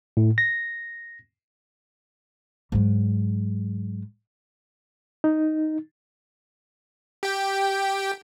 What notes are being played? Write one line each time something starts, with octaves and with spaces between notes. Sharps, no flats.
A2
A#6
G#2 F#3
D#4
G4 G5